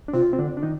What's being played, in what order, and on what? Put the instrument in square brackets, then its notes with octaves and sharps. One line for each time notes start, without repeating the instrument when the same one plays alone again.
[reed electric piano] D4
[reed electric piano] C3 C4 [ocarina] F4
[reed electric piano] C4
D3 D4
D4
D#3 D#4